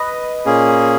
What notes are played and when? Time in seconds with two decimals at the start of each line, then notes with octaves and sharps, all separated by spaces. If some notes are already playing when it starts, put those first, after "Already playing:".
Already playing: B4 D#5
0.46 A#2 A#3 C#4 G#4